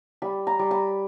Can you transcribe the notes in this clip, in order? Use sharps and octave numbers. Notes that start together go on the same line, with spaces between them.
G3 B5
A#5
G3
B5